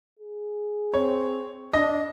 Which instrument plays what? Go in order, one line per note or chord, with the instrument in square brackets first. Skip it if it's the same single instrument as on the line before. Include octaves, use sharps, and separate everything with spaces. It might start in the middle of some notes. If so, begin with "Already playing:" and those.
[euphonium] G#4
[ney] C4 [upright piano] C#5
[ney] D4 [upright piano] D#5 A#6